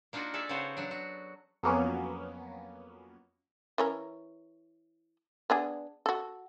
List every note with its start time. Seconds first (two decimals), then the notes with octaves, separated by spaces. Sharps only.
0.13 A#3 D4 D#4 F4 F#4 A#4
0.34 G#4 A4 D5 E5
0.49 C#3 B3 D#4 F#4 C5 C#5
0.77 F#3 D4
0.91 F#4
1.63 F2 F#3 A#3 B3 C#4
3.78 E3 C#4 A#4
5.50 B3 D4 G#4
6.06 F#4 A4